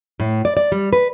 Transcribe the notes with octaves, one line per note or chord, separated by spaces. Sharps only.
A2
D5
D5
G3
B4